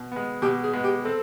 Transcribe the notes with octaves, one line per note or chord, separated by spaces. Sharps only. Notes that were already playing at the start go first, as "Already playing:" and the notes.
Already playing: B2
G#3 B3
B2 G4
G#4
G#3 B3
G4
C4 A4